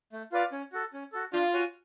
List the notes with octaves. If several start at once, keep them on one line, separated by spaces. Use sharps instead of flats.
A3
F4 B4 D5 F5
C#4
F#4 A4
C#4
F#4 A4
D4 F4
F#4 C#5 G#5